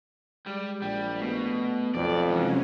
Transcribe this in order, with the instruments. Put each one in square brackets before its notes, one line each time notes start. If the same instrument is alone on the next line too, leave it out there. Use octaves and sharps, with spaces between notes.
[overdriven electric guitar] G3 [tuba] G#3
[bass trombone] A#1 [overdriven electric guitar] G3
[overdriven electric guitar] B2 [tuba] A3
[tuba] B1 [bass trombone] F2 [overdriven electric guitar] D5
[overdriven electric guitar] G#2 [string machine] C3 F#3 C#4 [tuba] E3